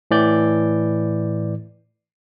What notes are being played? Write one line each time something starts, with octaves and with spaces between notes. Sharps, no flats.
A2 E3 D5 G6